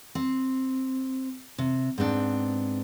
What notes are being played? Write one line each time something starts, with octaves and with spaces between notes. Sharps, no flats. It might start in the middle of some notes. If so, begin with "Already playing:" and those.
C4
C3
G#2 B3 C4 D4